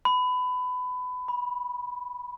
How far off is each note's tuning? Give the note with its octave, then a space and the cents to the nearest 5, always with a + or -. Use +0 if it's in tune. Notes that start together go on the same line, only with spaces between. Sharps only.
B5 +25
B5 -15